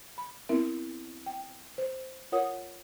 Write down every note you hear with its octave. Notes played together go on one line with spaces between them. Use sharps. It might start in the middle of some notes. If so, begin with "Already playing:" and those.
B5
B3 C4 E4 A#4 E5
G5
C5
F4 A#4 C#5 F#5 D#6